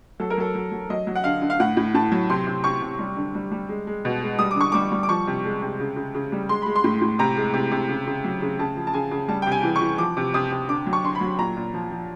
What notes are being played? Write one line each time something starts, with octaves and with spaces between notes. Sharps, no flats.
F#3 A4
A#4
F#3 A4
F#3
F#3
F#3 D#5
F#3
F#5
D3 F5
D3
F5
A2 F#5
A2
A2 A5
F#3
C3 C6
C3
C3 C#6
C3
G3
D3
G3
G3
G#3
G#3
B2
G#3
G3 D#6
D6
D3 C#6
G3 D6
G3
D6
F3 C#6
C3
G#3
C3
C#3
C#3
C#3
G3
G#3 C6
G#3 B5
C6
A2
A2
C3 A#5
G#3
C3
C3
C#3
C#3
F#3
C#3
C#3 A5
F3
A5
C#3 G#5
C#3
G3 A5
C3 G5
G#5
E3
C#6
E3
F3 D6
C3
C3 D#6
C3
D3 D6
F#3
C#6
D3 C6
B5
F#3
A#2 A#5
A#2
F3
F3